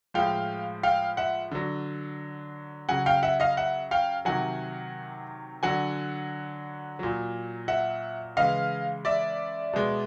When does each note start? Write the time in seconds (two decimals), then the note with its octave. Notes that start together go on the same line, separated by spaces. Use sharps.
0.14 A2 F3 G#3 F5 G5
0.83 F5 G5
1.17 E5 F#5
1.52 D3 F#3
2.89 C#3 F#3 F#5 G#5
3.06 F5 G5
3.23 E5 F#5
3.40 D#5 F5
3.57 E5 F#5
3.91 F5 G5
4.25 C3 D#3 F#3 F#5 G#5
5.63 D3 F#3 F#5 G#5
6.99 A#2 F#3
7.68 E5 F#5
8.37 C#3 E3 G#3 D#5 F5
9.05 D5 E5
9.73 B2 G#3